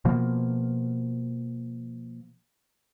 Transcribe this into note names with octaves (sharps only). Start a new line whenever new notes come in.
B2 F3 A#3